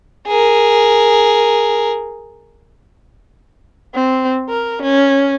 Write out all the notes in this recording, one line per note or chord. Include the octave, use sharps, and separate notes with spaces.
G#4 A#4
C4
A#4
C#4